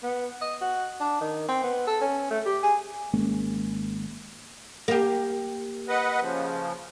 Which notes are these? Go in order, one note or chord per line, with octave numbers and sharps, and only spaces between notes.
B3
D#5
F#4
D4
D#3
C4
B3
A4
C#4
A3
G4
G#4
G#1 G#3 A#3 C#4
A#3 G4
B4 D#5 F#5
C#3 F3